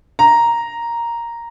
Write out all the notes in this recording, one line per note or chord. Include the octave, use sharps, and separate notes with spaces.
A#5